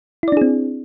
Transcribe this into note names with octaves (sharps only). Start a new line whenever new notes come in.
C4 D4 E4 G#4 D5